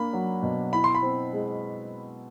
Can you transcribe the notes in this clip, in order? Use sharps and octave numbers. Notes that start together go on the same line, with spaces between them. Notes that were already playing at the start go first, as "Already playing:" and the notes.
Already playing: A#3 D4 B5
F#3
B2
E4 B5
C6
B5
C4
G#3